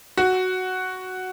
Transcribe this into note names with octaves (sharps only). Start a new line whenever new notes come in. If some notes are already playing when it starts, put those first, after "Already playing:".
F#4